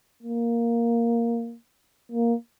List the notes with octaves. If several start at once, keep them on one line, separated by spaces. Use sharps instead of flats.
A#3
A#3